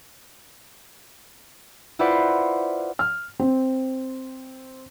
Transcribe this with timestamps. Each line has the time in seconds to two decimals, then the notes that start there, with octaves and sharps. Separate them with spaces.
1.99 E4 F4 B4 C5 D5 F#5
2.99 F6
3.40 C4